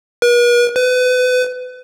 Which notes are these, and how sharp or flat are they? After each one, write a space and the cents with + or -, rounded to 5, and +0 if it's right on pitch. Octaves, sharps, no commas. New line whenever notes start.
B4 -45
B4 +30